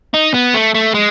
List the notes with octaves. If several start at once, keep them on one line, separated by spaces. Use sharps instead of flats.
D#4
B3
A3
A3
G#3